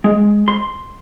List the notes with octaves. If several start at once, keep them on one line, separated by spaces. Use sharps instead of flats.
G#3
C6